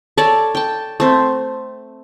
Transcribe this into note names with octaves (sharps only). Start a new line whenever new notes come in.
A4 C#5 D5 A5
G5 A5
A3 C4